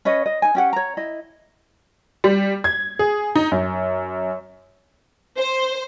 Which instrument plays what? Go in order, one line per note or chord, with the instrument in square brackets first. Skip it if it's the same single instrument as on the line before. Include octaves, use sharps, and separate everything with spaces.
[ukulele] C#4 B4 C#5 D#5
D#5
D#4 G#5
C#4 G4 F#5
C#5 A#5
E4 D#5
[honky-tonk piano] G3
G#6
G#4
D#4
F#2
[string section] C5